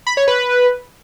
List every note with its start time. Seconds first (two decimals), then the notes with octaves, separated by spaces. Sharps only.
0.07 B5
0.17 C#5
0.28 B4